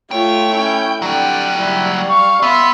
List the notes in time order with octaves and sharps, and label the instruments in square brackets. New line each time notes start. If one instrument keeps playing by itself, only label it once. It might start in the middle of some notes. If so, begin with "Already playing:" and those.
[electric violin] A3 C#5 [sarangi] F4 [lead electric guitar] G5
[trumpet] C#4 [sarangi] E4
[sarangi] D3 [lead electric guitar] F#3 G5 [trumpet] G3 [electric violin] F#6
[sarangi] G3 [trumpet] E4
[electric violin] F5 [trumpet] C#6
[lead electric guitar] B3 [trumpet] E5 [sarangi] C6